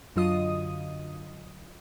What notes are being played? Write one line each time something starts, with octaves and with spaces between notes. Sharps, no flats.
F#2 D3 F#3 F4 D#5 D#6